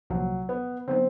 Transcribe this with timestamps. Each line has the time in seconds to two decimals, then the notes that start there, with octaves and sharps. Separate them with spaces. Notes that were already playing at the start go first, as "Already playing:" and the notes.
0.10 C2 A#2 F3 F#3
0.49 B3
0.88 D3 F#3 B3 C4 D#4